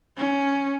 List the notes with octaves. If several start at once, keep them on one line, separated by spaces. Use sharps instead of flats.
C#4